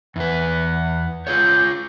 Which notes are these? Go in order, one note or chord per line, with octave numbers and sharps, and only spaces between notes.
E2 B4 F#5
F4 G#4 C#5 G6